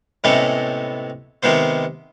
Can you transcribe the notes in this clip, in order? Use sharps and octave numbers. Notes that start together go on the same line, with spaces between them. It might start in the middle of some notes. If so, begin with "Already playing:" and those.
A2 C3 G#3 A3 B3 C#4
C3 D#3 G#3 B3 C5